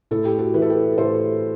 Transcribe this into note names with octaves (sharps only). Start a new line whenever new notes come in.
A2 A4
G4
F#4 A4
E3 B4
A4
G4 B4
A2 A4 C5